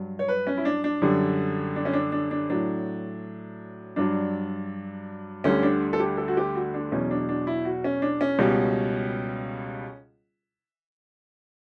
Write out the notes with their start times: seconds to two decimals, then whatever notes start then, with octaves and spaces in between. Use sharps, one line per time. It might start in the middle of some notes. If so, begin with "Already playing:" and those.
Already playing: G2 F#3
0.19 C#5
0.28 B4
0.47 C#4
0.57 E4
0.65 D4
0.84 D4
1.02 F#2 D3 G3
1.76 D4
1.85 C#4
1.93 D4
2.12 D4
2.31 D4
2.50 A2 F#3 D4
3.96 G2 F#3 D4
5.44 D2 D3 G3 C#4
5.63 D4
5.93 A4
6.00 G4
6.17 A4
6.28 F#4
6.37 G4
6.56 F#4
6.74 D4
6.92 E2 B2 F#3 C#4
7.11 D4
7.29 D4
7.47 E4
7.65 F#4
7.84 C#4
8.02 D4
8.21 C#4
8.39 C#2 B2 G3